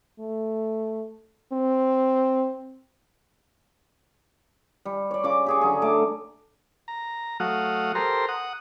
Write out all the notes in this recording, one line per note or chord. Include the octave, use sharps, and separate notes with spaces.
A3
C4
G3
C#5 D5
C#3 D6
G4 G#4 C#6
D3 F#3 G#4
A3 D6
A#5
F#3 A3 F5 F#5 D#6
G4 A4 A#4 C5 A#5 C6
F#5 D#6